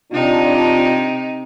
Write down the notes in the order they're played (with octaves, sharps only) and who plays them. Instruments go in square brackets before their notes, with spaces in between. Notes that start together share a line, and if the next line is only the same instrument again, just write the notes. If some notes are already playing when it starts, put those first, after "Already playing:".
[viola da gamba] C3 D#4 [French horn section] D4 F4